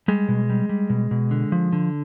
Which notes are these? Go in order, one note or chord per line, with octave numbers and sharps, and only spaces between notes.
G3 G#3
B2
G3
G3
B2
B2
D3
F3
D3